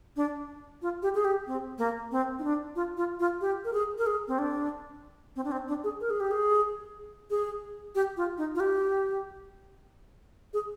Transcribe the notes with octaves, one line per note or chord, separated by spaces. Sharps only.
D4
F4
G4
G#4
G4
C4
A#3
C4
D#4
D4
F4
F4
F4
G4
A#4
G#4
A#4
G#4
C4
D4
C4
D4
C4
D4
G#4
A#4
G#4
G4
G#4
G#4
G4
F4
D#4
F4
G4
G#4